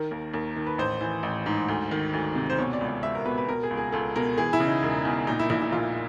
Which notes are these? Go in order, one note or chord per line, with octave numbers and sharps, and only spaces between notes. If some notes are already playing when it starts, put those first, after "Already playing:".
Already playing: D#3 A#4
D#2
D#2
D#3
B4
A1 C5
E3
A1
G#2
D2
D#3
D2
C3
C5
B2 C#5
D5
C#2
D5
C#2 E5
A#4
B2 B4
B4
B2 A#4
G#4
C#2
G#4
C#2 A4
B2 A#4
E3 G#4
E4
C#3
D#4
E1
E2
A#2 D#4
E4
A#1 E4
E4
A#1 F4